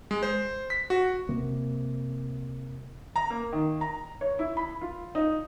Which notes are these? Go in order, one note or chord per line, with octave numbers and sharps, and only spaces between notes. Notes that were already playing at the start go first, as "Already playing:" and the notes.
G#3
C5
B6
F#4
C3 A#3
A#5
A#3
D#3
A#5
C#5
E4
B5
F4
D#4